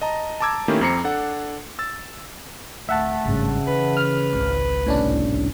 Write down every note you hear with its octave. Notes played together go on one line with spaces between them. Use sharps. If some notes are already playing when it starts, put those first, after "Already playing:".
D#5 A5 A#5
A5 A#5 D6 E6 G#6
D#3 A3 A#3 C#4 E4 G4
F2 C4 A#5 C7 C#7
D4 A4 F#5
E6 A6
D1 A3 E5 F#5 A5
G#1 G2 C#3
E3 B4
F6
G#1 C#2
C2 A2 C#4 D4